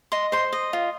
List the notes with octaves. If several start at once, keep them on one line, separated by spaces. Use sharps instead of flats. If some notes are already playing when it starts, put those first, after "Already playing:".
D#5 C6
C5 C6
D#5
F4